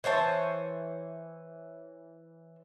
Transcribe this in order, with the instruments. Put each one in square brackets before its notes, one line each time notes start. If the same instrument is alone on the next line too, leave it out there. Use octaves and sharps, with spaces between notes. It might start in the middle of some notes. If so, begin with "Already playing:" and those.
[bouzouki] E3 C5 C#5 A5